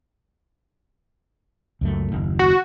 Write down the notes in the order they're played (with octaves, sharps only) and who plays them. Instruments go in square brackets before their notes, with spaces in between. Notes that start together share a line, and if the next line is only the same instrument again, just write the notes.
[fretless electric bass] C#2 F#2 A3
F#1 D#2
[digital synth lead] F#4